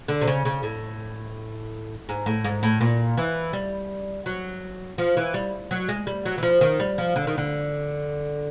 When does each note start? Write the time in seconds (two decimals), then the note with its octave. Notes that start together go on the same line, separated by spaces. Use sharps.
0.08 D3
0.21 C3
0.27 C#3
0.45 C#3
0.63 A2
2.09 G#2
2.26 A2
2.45 G#2
2.63 A2
2.81 A#2
3.18 E3
3.53 G3
4.26 F#3
4.98 F3
5.17 E3
5.34 G3
5.71 F#3
5.89 G#3
6.07 G3
6.25 F#3
6.38 E3
6.43 F3
6.61 D#3
6.80 G3
6.98 F3
7.16 D3
7.27 D#3
7.37 D3